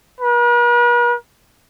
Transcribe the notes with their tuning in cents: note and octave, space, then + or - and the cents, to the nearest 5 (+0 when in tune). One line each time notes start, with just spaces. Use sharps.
B4 -45